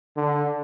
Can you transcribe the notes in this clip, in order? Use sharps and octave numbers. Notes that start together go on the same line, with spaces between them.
D3